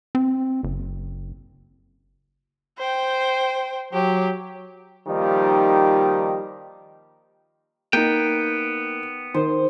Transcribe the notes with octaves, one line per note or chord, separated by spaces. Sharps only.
C4
F#1
C5 G5
F#3 G4
D#3 F3 G3 A#3 D#4 G4
A#3 B3 D#4 G5
D#3 C5